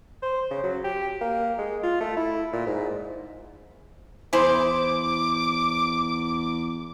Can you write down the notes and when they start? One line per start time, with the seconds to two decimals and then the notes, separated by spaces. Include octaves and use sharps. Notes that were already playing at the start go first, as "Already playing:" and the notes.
0.22 C5
0.50 C#3
0.63 F#3
0.84 G4
1.21 A#3
1.58 G#3
1.83 F4
2.00 A3
2.17 E4
2.53 A#2
2.66 G#2
4.33 E2 E4 G#4 C5 D6